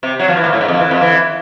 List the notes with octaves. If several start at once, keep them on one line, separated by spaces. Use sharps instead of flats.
C3
F#3
F3
E3
A#2
A2
G#2
F2
E3
F2
E3